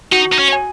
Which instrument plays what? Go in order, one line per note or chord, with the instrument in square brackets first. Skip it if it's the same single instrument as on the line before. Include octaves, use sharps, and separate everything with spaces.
[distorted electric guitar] D#4 [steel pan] F#4
[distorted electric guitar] D#4
C#4
[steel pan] G#5